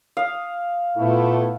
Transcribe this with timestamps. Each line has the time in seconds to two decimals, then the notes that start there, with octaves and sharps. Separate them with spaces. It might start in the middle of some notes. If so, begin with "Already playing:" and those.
0.17 F5 D#6
0.97 A#2 A3 B3 E4